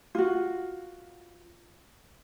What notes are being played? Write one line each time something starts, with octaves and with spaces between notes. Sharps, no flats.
F4 F#4